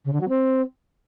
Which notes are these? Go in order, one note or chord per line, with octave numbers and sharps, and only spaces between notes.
C#3
D3
F#3
C4